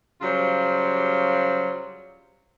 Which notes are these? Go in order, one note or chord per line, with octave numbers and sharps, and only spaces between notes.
C#3 F#3 G3 F4 C5 C#5